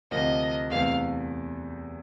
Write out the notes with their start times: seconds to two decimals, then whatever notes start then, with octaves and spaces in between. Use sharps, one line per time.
0.11 D2 C3 F3 A#3 D#5
0.70 E2 C3 E3 A3 F5